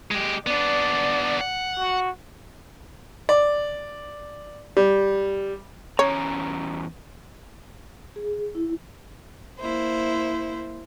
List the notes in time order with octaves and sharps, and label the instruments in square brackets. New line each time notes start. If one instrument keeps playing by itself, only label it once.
[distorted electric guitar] G#3 G4
[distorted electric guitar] B3 D4 [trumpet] D5
[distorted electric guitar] F#5
[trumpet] F#4
[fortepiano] D5
G3
[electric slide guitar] E2 C#4 A#5 [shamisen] C#5
[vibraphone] G#4
E4
[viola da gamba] A#3 E4 C5